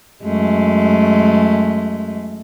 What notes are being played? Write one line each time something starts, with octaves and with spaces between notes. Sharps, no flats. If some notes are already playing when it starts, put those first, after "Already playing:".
F#2 G#3 A3